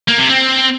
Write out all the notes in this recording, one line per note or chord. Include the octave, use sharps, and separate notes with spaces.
A#3
C3
C4